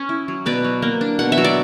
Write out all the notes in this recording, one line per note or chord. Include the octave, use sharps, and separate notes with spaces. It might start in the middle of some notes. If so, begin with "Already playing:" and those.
Already playing: C#4
E4
F#3
B2 B4 D5
F#3
A#3
D4
B2 F#5
E5
F#3
D5